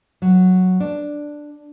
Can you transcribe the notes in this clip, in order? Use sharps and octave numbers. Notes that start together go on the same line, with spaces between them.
F#3
D4